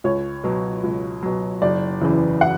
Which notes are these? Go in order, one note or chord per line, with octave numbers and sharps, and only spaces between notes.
C#2 C#5
B2 F#3
C#2
B2 F#3
F#1 D5
E2 C#3 E3
F#5